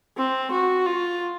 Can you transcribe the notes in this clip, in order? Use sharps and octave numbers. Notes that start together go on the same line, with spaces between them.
C4
F#4
F4